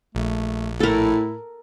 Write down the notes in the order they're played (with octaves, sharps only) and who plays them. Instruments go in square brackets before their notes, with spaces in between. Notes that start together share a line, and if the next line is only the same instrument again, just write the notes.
[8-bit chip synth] A#1 [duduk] A3
[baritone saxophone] A2 [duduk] E4 [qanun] A4 A#4